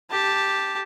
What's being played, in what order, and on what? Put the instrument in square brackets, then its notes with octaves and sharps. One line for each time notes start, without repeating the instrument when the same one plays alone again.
[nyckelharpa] G4 A5